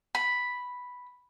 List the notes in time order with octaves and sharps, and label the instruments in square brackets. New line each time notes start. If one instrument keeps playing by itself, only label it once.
[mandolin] B5